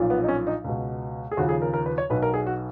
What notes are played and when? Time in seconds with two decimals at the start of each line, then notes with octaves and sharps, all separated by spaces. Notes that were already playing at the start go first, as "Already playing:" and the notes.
Already playing: B1 A#2 F3
0.10 B3
0.23 D#4
0.28 C#4
0.47 D#4
0.64 C#2 B2
1.31 G#4
1.37 D#2 C#3 F3 F#4
1.49 G#4
1.62 A#4
1.74 A#4
1.86 B4
1.98 C#5
2.10 B1 B2 B4
2.23 A#4
2.34 G#4
2.47 F#4